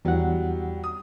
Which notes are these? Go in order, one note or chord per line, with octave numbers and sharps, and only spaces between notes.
E2 F#3 G3 F#5
D#6